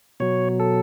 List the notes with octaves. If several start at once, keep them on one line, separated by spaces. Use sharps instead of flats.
B2 F#3 C#5
A4